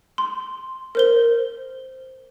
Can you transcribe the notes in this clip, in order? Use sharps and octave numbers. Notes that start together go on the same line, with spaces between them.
C6
A#4 C5 G7